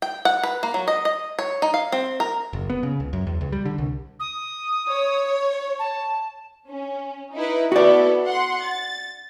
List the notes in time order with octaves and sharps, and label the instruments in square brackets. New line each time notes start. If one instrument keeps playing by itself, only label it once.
[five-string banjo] G5
F#5
B4
A#3
F#3
D#5
D#5
C#5
D#4
F5
C4
A#4
[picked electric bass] F#1
B3
C#3
C#2
F#2
E2
C#2
G3
D3
C2
[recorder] D#6
[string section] C#5
[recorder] A5
[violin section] C#4
D#4 E4 B4
[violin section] B3 E4 A4 [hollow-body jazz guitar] F#4 D5
[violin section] F#5 C6
A6